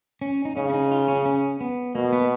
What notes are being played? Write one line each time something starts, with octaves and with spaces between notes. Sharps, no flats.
C#4
D#4
C#3 C#4
C#4
D#4
F4
C#4
C#4
B3
B2 A#3
B3